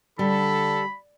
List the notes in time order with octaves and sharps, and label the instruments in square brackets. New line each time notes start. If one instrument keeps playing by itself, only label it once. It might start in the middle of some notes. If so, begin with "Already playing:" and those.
[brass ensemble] D3 A4 [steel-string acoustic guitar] G3 [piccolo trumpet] B5